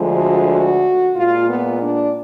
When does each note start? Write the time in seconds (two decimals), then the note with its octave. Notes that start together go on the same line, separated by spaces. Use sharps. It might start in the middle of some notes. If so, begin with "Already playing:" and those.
Already playing: D2 D3 F3 G#3
0.15 F#4
0.50 F#4
1.16 A#2 G#3 F4
1.50 B3
1.82 D4